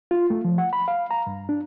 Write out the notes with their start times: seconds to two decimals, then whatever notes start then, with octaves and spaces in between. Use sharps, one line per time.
0.11 F4
0.30 A3
0.45 F3
0.58 F#5
0.73 B5
0.88 F5
1.11 A#5
1.27 G2
1.49 D4